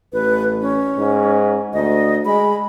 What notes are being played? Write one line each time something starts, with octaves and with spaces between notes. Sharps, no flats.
A1 B4
C#4
G#2
D2 D#5
G#3 B5